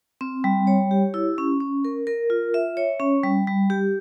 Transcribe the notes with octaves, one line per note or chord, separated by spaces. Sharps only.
C4
G3
C#5
G4
E4
C#4
C#4
A#4
A#4
F4
E5
C#5
C#4
G3
G3
G4